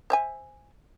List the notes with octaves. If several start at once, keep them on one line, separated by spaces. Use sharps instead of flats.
C5 E5 G#5